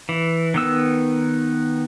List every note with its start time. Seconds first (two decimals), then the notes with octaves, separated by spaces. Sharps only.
0.09 E3
0.54 D#3 B3 E6